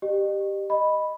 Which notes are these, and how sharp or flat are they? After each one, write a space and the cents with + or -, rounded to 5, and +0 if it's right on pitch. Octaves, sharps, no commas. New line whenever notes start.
G4 +0 D#5 -40
D#5 +0 B5 +0